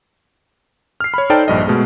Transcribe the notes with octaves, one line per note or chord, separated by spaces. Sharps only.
F6 C7
C#5 B5
D#4 A4 C5 D5 G5 A5
A#1 G2 D#5
B2 G#3 A3